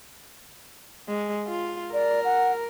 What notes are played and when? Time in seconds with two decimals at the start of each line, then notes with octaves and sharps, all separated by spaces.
1.09 G#3
1.47 F4
1.93 A#4 D5
2.24 F#5